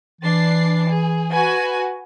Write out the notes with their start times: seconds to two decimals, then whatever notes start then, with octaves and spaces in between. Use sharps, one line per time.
0.21 E3 D4 A6 C7
0.89 G#4
1.32 F#4 B4 G#5